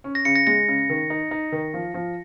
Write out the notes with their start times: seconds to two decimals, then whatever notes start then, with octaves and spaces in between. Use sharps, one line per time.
0.04 C#4
0.15 A#6
0.25 C#3 C#7
0.35 A#6
0.47 G#3 A#6
0.68 C#3
0.90 D#3
1.10 D#4
1.31 D#4
1.52 D#3
1.74 F3
1.94 F3